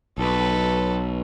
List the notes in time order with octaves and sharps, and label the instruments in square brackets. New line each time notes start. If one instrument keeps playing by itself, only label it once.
[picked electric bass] B1 [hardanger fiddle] A4 B4